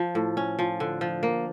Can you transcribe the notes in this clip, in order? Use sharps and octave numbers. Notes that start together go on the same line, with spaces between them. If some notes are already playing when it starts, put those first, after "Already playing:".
Already playing: F3
A2
C#4
F3
D3
F3
A#3